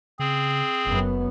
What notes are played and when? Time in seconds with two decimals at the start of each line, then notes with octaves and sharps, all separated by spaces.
0.19 C#3 C4 G#4
0.86 F#1 F#2 B3